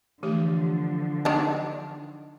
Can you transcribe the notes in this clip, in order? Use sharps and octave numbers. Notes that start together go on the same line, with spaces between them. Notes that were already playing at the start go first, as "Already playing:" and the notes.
D3 E3 F3 A3 G4
D#3 D4